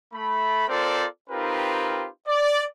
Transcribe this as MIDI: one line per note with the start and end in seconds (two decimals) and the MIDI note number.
0.14 0.67 57
0.14 0.67 83
0.68 1.06 60
0.68 1.06 65
0.68 1.06 69
0.68 1.06 70
0.68 1.06 72
0.68 1.06 74
1.30 2.08 60
1.30 2.08 63
1.30 2.08 65
1.30 2.08 67
1.30 2.08 70
1.30 2.08 71
2.28 2.64 74